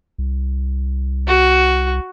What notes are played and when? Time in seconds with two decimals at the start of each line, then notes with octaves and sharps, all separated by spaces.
0.18 C2
1.28 F#4